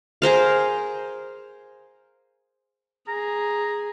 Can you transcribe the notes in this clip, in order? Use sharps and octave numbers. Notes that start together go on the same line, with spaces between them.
G#4 A#4 C5 F5
G#4 A#5